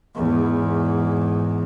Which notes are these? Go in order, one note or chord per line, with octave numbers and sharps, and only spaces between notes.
E2 G#2